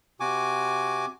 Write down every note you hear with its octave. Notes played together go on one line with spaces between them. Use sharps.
C3 F#4 G#5 D6